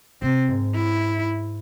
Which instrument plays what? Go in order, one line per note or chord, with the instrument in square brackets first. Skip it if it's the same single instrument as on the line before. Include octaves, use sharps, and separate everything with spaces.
[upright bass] C3 [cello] C4
[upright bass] G#2
[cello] E4